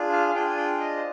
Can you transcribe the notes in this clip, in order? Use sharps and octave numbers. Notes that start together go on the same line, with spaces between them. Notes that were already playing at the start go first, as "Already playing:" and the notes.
Already playing: D4 F4 G#4
F5
F5
D4 F4 G#4 G5
G#5
G5
D#5
C5